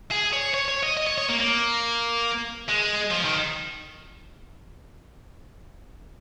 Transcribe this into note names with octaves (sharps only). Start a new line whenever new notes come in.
G#4
C#5
C#5
C#5
D#5
D#5
C#5
C#5
A#3
A#3
G#3
F3
D#3